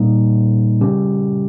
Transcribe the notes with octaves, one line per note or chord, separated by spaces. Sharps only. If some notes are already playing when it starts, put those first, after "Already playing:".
Already playing: A#2 G3 A#3 D#4
C#3 G3 C#4 G4